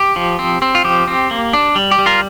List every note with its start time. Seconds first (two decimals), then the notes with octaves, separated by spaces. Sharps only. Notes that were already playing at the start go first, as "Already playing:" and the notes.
Already playing: G4
0.16 F3
0.39 C4
0.62 C4
0.75 F4
0.85 F3 G4
1.08 C4
1.31 A#3
1.53 D4
1.76 G3
1.91 G4
1.99 G3
2.06 F4 A#4